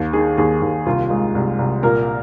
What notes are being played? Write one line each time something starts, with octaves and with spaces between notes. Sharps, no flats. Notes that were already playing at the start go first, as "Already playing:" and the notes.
Already playing: D#2
D#3 G#4
D#2 G#4
D#2
C2 F4
G#3
C2
C2
A#2 A#3 A#4